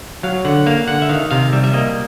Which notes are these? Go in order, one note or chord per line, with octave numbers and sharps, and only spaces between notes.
F#3 F5
D3 F#5
A#3 F5
D3 F#5
E5
D#3 F5
C3 F5
G3 E5
E5
A#3 D#5